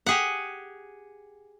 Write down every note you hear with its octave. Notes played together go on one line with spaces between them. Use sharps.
G4 G#4 F#5